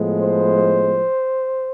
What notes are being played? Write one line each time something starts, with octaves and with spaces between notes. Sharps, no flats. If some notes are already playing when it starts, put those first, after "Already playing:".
Already playing: A2 F3 G#3 B3
C5